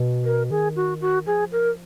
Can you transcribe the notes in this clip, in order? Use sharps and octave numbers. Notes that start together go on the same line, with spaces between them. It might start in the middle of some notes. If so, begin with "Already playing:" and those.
Already playing: B2
A#4
D#3 G#4
F#4
F#4
F3 G#4
A#4